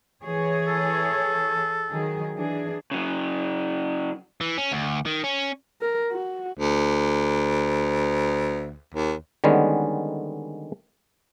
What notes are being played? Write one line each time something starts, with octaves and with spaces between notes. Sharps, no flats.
E3 G#4 C#5
A4
D#3 F#3 G#4
E3 D4 G#4
C#3 F#3
E3
C#4
D2
D#3
C#4
A#4
F#4
D2
D#2
D3 D#3 G3 G#3 B3 C#4